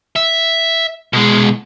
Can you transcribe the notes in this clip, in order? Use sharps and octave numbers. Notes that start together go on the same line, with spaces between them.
E5
B2 G#3